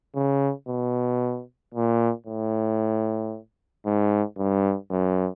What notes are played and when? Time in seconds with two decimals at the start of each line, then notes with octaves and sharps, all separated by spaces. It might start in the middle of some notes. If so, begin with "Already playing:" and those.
0.15 C#3
0.68 B2
1.74 A#2
2.27 A2
3.86 G#2
4.38 G2
4.91 F#2